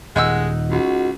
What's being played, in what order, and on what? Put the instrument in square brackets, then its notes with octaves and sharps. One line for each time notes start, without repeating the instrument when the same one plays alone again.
[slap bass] D#1 [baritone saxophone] G#3 [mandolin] D#4 F#5 E6
[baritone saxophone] C#2 [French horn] F#4